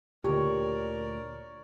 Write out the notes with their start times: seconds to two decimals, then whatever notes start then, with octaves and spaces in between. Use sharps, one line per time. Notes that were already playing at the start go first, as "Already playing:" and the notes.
0.24 D2 A#2 D3 G4 A#4 C#5 D5